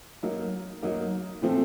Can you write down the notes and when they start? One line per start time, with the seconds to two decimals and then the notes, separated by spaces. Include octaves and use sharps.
0.23 F#3 A#3 D#4
0.83 F#3 A#3 D#4
1.42 A#2 F3 A3 C4